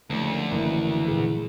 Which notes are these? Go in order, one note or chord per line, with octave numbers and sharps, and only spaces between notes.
F#1 D2 F3 A3 A#3
F#1 E3
A#2 G#4